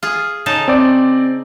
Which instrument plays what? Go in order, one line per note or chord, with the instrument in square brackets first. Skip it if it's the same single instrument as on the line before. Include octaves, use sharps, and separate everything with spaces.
[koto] F4 G#4
C#3 D#4 A5
[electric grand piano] C4 D5